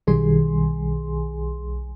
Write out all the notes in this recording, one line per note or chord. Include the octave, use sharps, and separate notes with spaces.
B1 D#3 G3 G#4 G#5 C6